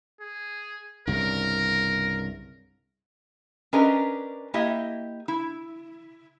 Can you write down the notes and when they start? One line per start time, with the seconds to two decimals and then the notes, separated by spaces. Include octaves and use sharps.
0.20 G#4
1.07 C2 G2 C#3 A#4
3.73 C#4 D4 G4 A#4 B4 D#5
4.54 A#3 E4 G4 D#5 E5
5.28 E4